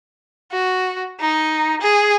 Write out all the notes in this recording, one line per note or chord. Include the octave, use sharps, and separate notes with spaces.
F#4
D#4
G#4